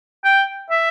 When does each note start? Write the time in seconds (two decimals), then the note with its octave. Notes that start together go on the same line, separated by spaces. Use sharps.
0.24 G5
0.71 E5